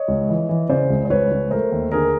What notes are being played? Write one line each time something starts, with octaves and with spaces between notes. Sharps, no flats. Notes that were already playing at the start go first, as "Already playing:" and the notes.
Already playing: C#5 D#5
C#2
E3
E3
C#3 C5 D5
C#2
C5
C#2 B4 C#5
C#2
A3 A#4 C5
D#2
D3 G#4 A#4